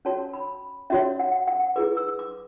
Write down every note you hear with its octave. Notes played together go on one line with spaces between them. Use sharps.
C#4 F#4 C#5 A5
B5
C#4 F#4 C#5 E5
F#5
F#5
E4 G#4 B4 D6
E6
D6